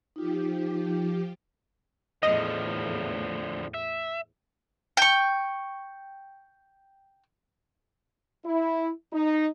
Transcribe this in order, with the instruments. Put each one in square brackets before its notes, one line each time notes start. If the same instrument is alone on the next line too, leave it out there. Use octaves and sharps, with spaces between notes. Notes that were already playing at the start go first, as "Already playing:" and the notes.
[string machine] F3 G4 [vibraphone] D#4 F4
[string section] E2 A2 [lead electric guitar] D3 F3 [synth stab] D#5
[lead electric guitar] E5
[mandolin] G5 C#6
[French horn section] E4
D#4